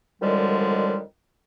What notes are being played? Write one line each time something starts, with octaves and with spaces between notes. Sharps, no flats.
F#2 D3 D#3 F3 G3 G#3